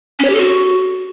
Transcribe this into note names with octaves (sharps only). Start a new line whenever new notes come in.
C#4
C#5
G4
A4
F#4